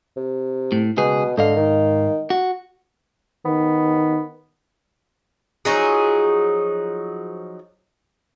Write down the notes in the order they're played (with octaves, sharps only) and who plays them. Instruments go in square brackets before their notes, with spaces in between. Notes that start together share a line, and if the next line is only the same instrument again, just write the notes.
[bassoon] C3
[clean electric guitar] A2
[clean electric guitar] C#2 G#4 [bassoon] B2
[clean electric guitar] G#2 D#5 F5 [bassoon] D3
[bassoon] D#3
[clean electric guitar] F#4
[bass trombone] D#3 [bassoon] B3
[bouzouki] F3 F#3 D#4 G#4